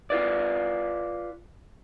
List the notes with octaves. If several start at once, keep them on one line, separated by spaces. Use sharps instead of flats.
F4 B4 D5